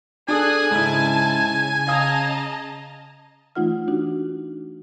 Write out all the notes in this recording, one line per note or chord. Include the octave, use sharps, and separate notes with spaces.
D4 G#4 A4 G#5 D#6 F#6
G#2 C#3 E4 A5
D#5 F5 A5 A#5 D#6
E3 A3 D#4 F4 F#5 F6
D4 D#4 F#4